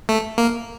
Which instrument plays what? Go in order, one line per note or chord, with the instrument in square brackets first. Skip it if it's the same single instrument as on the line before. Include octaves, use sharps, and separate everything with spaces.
[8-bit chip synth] A3
A#3